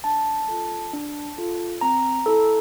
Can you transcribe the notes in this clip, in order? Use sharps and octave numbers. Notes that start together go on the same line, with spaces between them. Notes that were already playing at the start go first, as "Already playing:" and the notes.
D4 A5
F4 A4
D4
F4 A4
C4 A#5
E4 A4